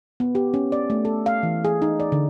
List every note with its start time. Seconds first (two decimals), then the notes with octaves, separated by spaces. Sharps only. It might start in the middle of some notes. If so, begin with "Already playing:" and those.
0.20 B3
0.35 G4
0.54 C#4
0.72 D5
0.90 A3
1.05 A4
1.26 F5
1.43 E3
1.65 G#4
1.82 D#4
2.00 D5
2.12 D3